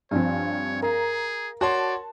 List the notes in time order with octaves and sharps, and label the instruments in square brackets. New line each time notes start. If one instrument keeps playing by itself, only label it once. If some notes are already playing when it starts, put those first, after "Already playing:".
[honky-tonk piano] G2 F3 C4 [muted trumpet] C#5 [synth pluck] F5 G#5
[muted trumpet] G#4 [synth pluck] A#4 [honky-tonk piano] A#5
[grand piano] F#4 C#5 C6 [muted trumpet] D5 [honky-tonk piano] A5